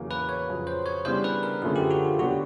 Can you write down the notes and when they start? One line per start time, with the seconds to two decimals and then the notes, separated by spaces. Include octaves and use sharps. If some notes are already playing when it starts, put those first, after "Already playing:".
Already playing: E2 C#3 F#3 A#3
0.11 B4
0.29 C#5
0.48 F2 C#3 F#3
0.67 C5
0.86 C#5
1.05 C#3 E3 G3 B3 D4 C5
1.24 B4
1.43 A#4
1.62 F#2 D3 F3 A3 C#4 G#4
1.76 G4
1.91 F#4
2.05 F4
2.19 D3 F#3 B3 D4 F#4 G4